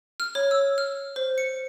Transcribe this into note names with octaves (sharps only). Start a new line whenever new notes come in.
F6
C#5
E6
F6
C5
C#7